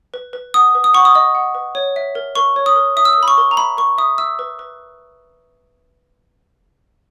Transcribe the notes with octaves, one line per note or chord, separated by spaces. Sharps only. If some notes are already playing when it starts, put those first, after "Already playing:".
B4
B4
F#5 D#6
B4
D#6
F#5 C#6
D#6
D#5
F#5
B4
C#5
E5
A#4
A#4 C#6
C#5
D#6
A#4
E5 D#6
E6
A#4 D#6
B5
C#6
A#4
A#5
E5 B5
A#4 C#6
E5 D#6
E5 E6
B4
B4